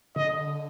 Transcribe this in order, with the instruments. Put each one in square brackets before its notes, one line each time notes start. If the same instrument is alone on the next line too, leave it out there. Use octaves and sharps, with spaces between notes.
[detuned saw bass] D3 [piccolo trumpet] D#5